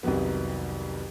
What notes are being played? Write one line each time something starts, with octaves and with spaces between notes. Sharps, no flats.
C2 F2 C3 D#3 F#3 B3